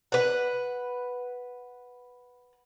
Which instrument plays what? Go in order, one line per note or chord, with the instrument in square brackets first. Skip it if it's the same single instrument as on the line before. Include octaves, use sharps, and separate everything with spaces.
[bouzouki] B4 F#5